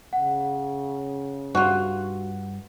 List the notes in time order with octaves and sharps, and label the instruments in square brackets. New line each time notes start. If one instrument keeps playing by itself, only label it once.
[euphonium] C#3 [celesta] F#5
[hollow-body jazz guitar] G2 [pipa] F4 F#4 [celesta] F#5